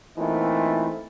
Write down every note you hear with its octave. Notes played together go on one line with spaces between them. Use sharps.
A#2 E3 A3 C4 D#4 F4